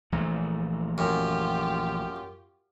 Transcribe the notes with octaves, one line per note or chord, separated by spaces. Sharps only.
A#1 E3 A3
F#2 F4 G4